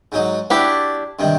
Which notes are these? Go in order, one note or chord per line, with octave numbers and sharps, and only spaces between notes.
G#2 F#3 D#4
D4 E4 F#4 G4 A4
G2 C3 D#3